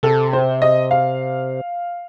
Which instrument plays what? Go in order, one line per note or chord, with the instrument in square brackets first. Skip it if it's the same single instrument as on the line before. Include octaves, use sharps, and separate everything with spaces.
[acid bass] C3 [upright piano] A4
[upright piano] C5
D#5
F5